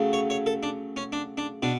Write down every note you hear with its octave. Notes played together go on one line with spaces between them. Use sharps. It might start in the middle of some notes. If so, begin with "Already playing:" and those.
Already playing: C#3 F#3 A3
C#5
C#5
A4
D4
C#4
D4
D4
B2 D4